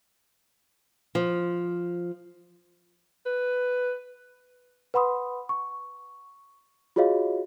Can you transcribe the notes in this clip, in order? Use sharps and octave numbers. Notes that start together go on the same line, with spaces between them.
F3
B4
B4 F#5 B5 C6 D#6
C#6
F4 F#4 G#4 C#5 D#5 F5